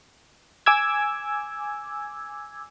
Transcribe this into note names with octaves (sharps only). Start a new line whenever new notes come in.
G#5 D6 E6 G#6